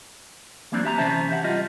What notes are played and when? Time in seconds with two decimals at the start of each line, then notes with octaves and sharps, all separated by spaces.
0.72 E3 F#3 A#3 C4 D4
0.84 G4 E5 A5 A#5
0.98 C3 E3 C#4 C5 E5 A5
1.30 G4 E5 F#5
1.44 G3 F4 G4 D#5